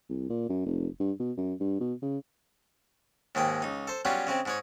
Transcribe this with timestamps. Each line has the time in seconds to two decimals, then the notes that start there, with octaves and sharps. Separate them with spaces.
0.09 C2
0.30 A#2
0.49 F#2
0.66 F1
1.00 G2
1.19 B2
1.37 F#2
1.60 G2
1.80 B2
2.02 C#3
3.35 D#2 G#2 G#3 G5
3.62 C#2 D#4
3.87 A4 C5
4.05 F#3 G3 B3 C#4 F4
4.27 C#3 G#3 C4
4.46 G#2 G#3 C#5